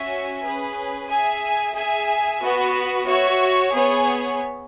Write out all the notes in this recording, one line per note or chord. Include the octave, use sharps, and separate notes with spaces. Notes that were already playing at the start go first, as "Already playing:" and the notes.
Already playing: C#4 F#4 C#5 E5 G#5
C#4 G#4 B4
G#4 E5 G#5
G#4 E5 G#5
B3 F#4 B4
F#4 C#5 E5
B3 G#4 C#5